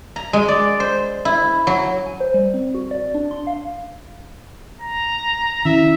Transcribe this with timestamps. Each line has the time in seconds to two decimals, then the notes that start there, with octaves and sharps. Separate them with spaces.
0.16 A#5
0.33 G#3
0.48 D5
0.80 C5
1.25 E4
1.67 F#3
2.06 G#5
2.20 C5
2.34 G3
2.54 C4
2.74 F#4
2.91 D5
3.14 D4
3.31 C6
3.47 F5
4.81 A#5
5.65 D#3 C#4 E4 E5